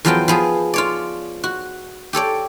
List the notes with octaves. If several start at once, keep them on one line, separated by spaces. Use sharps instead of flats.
E2 F3 F#3 B3 F4 G5
F3 B3 G#4
F4 C#5 D5
F#4
G4 A4 C#5 D5